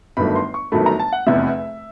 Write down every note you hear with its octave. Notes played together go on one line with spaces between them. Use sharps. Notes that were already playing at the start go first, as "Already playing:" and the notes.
G1 G2 D#3 F#3 A3 B5
C6
C#6
G1 G2 D#3 F#3 A3 B5
A#5
A5
F#5
F1 E2 C3 E5